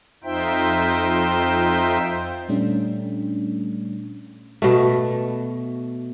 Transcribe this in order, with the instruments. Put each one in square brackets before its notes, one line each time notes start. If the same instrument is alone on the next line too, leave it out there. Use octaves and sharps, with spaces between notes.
[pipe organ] F2 D#4 F4 C5 E5 G5
[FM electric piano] A#2 G3 A3 C#4 D4
[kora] B2 A3